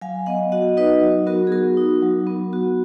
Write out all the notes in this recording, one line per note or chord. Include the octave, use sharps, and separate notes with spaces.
F#3 F5 G#5
B3 D#5 F#5
F#4 D#5 F#5
D#4 B4 D#5
F#3
B3 F#4 A#4
G#4
F#4 A#4
D#4
F#3
B3
F#4